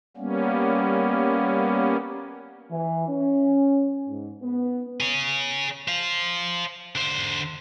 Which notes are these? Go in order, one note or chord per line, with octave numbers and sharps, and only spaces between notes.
G3 A#3 B3 C#4
E3
C#4
G#2
B3
G#4 C#5
C5 F5
D3 C5